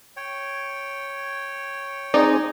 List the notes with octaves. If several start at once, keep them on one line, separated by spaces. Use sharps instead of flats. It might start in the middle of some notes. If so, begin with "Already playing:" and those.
C#5 G5
C4 D#4 G#4 D5